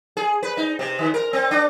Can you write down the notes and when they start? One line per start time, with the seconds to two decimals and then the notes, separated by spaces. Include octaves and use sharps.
0.17 G#4
0.43 B4
0.57 D#4
0.79 C3
0.99 D#3
1.14 A#4
1.33 C4
1.51 D4